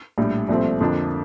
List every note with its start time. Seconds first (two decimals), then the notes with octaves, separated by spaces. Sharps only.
0.18 A#1 A2 G3 D4
0.49 C2 A#2 F3 A3 C4
0.81 F2 D3 F3 A#3 D4